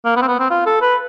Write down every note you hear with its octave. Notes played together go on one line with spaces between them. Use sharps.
A#3
B3
C4
B3
C4
F4
A4
B4